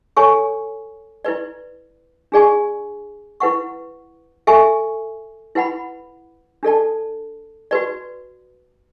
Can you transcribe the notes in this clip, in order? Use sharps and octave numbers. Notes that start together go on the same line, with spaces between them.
A4 C#5 G#5 C#6
E4 B4 D5
D4 G#4 D5 G#5 C#6
E4 B4 F#5 C#6
A4 E5 G#5 C#6
E4 B4 F#5 B5
D4 A4 D5 A5
F#4 B4 D5